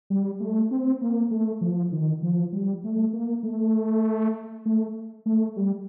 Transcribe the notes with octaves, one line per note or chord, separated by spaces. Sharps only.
G3
A3
C4
A#3
A3
F3
D#3
F3
G3
A3
A#3
A3
A3
A3
G3